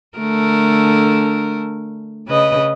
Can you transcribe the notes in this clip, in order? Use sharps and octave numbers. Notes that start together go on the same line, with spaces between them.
D3 A3 A#4
C#3 B4 D#5